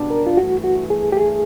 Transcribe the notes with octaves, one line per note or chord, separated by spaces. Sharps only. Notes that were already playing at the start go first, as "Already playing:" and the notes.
Already playing: C#2 B2 G3 B3 D4
A#4
F4
G2 E3 A3 F#4
F#4
G#4
G4
G#4